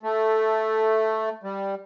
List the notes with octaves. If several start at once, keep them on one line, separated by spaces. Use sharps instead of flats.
A3
G3